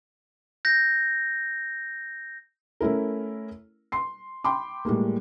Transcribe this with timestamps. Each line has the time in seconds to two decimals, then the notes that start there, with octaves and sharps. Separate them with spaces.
0.65 G6 A#6
2.81 A3 C#4 E4 A#4
3.92 C6 C7
4.44 G5 B5 C6 D6
4.85 A2 G3 G#3 A#3